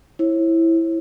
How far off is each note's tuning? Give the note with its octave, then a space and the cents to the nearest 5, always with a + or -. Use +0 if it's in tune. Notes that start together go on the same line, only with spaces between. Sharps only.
E4 +0 C#5 -40